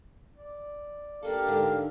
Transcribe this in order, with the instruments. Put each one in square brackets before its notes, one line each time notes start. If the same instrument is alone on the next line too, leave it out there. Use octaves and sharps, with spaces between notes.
[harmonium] D5
[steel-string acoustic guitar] A#3 D4 A4 [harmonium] G4 A#4 F5
[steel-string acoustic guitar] G#2 D3